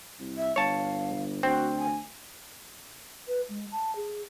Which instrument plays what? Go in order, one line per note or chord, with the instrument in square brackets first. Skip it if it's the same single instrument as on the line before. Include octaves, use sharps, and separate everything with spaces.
[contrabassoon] C2
[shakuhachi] E5
[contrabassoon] G1 [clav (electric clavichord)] C#5 A5 [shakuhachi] F5
[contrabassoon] D2 [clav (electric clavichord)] C4 [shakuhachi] F#4
[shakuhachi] G#5
[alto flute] B4
G#3
A5
G#4